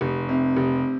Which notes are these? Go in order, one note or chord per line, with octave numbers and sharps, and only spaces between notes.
F1
C3
F1